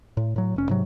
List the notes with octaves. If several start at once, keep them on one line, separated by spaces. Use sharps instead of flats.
A2
A2 F#3
F1 C#4
G#2 C3 F#3